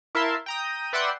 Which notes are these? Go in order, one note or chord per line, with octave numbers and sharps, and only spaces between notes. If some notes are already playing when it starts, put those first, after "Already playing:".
E4 A#4 E5 F5 A5 C6
G5 A#5 D#6
B4 D5 E5 F#5 G5 C6